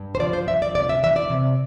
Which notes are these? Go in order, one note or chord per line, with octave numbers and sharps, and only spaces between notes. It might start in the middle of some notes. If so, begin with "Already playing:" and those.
Already playing: G2
C5
F3 D5
C5
F3 E5
D5
C3 D5
E5
E3 E5
D5
C3